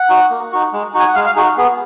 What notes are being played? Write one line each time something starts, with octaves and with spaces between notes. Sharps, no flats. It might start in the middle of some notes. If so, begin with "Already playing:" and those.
Already playing: F#5
D#4 F#4
A#3
D#4 F#4
G#3
D#4 F#4
G#5
F#5
G#3 F5
F5
D#4 F#4 G#4
B3 G#4